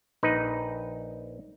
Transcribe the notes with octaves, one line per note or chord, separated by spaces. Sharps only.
A#1 D#4 B4